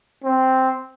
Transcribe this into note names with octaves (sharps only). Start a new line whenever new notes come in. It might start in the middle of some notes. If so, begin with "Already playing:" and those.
C4